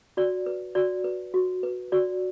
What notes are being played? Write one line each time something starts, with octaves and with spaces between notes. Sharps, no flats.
F#4 D5
B4
F#4 D5
B4
F#4
B4
F#4 D5